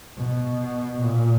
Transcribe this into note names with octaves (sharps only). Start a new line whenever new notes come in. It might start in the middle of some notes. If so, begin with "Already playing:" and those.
B2
A#2